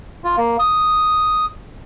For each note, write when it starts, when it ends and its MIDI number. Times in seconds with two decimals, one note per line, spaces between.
0.24 0.36 65
0.37 0.57 58
0.59 1.46 87